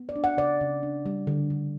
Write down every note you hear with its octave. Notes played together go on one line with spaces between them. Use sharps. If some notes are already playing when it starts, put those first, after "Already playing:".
Already playing: B3
D5
D4
F#5
C#3 D5
C#3
D4
G3
D3
D3